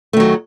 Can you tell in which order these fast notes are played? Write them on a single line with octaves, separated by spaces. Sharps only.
A3 D#3 F#3